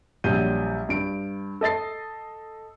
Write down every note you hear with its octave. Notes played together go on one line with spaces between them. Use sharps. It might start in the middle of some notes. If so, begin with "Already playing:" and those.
A#1 F#3 G3 G6 D#7
G2 D7
A4 D#5 A6 C7